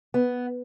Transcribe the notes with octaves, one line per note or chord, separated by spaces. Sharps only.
B3